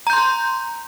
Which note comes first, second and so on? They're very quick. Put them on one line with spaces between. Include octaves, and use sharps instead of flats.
A#5 G6 C6